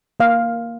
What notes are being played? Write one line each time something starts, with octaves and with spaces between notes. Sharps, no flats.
A#3 F5